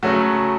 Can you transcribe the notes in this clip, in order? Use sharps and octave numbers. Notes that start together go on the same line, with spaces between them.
C#3 F#3 A3 F#4